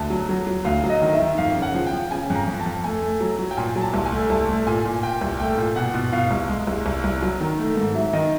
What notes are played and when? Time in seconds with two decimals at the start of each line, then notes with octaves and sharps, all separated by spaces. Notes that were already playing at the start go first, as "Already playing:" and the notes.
Already playing: D2 A5
0.10 F#3
0.29 F#3
0.47 F#3
0.65 D2 F5
0.84 F#3
0.90 D#5
1.02 D#3
1.14 E5
1.20 D#3
1.38 F2 F5
1.56 C#3
1.62 F#5
1.75 F3
1.86 G5
1.93 F3
2.11 C#3 G#5
2.30 F2
2.35 A#5
2.47 F2
2.60 A5
2.66 F2
2.84 A3 G#5
3.02 A3
3.21 F#3
3.39 F#3
3.51 G5
3.57 A#2 G#5
3.76 F#3
3.81 A5
3.94 C2
4.05 G#5
4.12 A3
4.30 C2 A5
4.48 A3
4.67 A#2 G#5
4.85 A#2
5.03 A#2 G5
5.21 C2
5.40 A3 G5
5.58 A#2
5.76 B2 F#5
5.94 B2
6.12 B2 F5
6.31 C2
6.49 G#3
6.67 C2
6.86 C2
7.04 C2
7.22 F#3
7.40 D#3
7.59 A3
7.77 G#2
7.95 F#3 E5
8.13 D#3 D#5